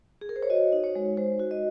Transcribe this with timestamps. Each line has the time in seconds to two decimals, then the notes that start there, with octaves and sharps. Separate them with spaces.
0.21 G#4
0.29 A#4
0.36 C5
0.43 C#5
0.50 F#4 D#5
0.72 D#4
0.84 C#5
0.95 G#3
1.17 G#3 C5
1.40 F#4
1.51 D#5